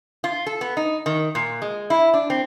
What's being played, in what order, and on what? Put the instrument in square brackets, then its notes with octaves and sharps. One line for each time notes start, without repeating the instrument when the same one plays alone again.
[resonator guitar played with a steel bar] F4
A4
B3
D#4
D#3
A#2
G#3
E4
D4
C4